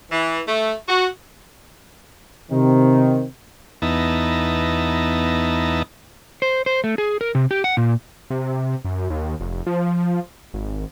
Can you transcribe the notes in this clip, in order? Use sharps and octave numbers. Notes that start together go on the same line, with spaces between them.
E3
A3
F#4
C3 D#3 C4
E2 B3 D#4 E5 A5 A#5
C5
C5
A3
G#4
A#4
C3
G4
F#5
A#2
C3
F#2
D#2
F1
F3
G#1